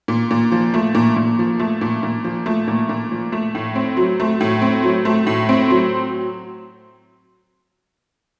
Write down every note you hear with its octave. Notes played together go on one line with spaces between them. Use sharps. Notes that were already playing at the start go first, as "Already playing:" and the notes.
A#2
A#2
F3
A3
A#2
A#2
F3
A3
A#2
A#2
F3
A3
A#2
A#2
F3
A3
A2
C4
F#3
A3
A2
C4
F#3
A3
A2
C4
F#3